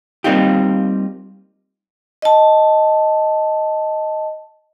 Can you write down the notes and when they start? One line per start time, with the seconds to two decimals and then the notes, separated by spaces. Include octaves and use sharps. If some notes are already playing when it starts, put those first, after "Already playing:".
0.24 G3 A#3 C4 D#4 F4 G4
2.22 D#5 A5